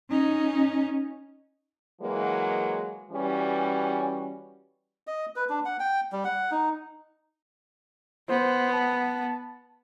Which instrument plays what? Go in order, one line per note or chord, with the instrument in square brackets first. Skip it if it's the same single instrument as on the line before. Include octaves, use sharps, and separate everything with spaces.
[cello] C#4 D#4
[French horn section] E3 F#3 G#3 A#3
E3 G3 C#4 F#4
[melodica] D#5
B4
D4
F#5
G5
G3
F#5
D#4
[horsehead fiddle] B3 [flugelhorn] C5
[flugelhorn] A5